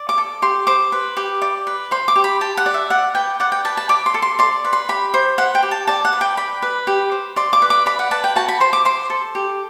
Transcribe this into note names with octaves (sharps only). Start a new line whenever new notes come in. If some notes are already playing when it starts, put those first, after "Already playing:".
Already playing: D5
D6
A4
G4 C6
C5 D6
B4
G4
D5
B4
C5 C6
D6
G4
B5
G4 A5
F#5
D5
E5
D5 F#5
B4 G5
D5 F#5
G5
B4 A5
A5
D5 D6
C6
A4
C6
D5 C6
B4
C6
G4 B5
C5
B4 F#5
G5
G4
A5
D5 A5
F#5
B4
G5
D5 B5
B4
G4
C5
D5 C6
D6
B4
D6
D5 B5
F#5
B4 A5
G5
F#4 A5
B5
C5 C6
D6
C5 C6
A4
G4